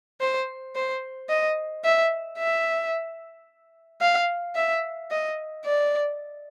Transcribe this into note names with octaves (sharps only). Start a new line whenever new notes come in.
C5
C5
D#5
E5
E5
F5
E5
D#5
D5